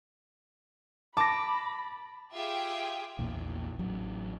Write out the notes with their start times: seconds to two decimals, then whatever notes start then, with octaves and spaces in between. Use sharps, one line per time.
1.17 A5 B5 D6 A#6
2.33 F4 G4 G#4 E5 G5
3.19 A#1 E2 A#2
3.79 A1 F#3